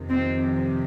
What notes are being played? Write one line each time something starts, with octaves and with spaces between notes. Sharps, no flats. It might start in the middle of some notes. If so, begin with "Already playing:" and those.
Already playing: F2 C3 D#3
C4